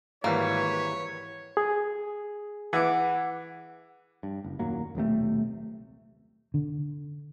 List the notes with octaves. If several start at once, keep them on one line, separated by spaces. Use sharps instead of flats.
G#1 E3 G3 A#3 B4 C#5
G#4
E3 F#5 D6
G2
F#1
D#1 F#2 F#3 A#3
D#1 B1 C3 A3
D3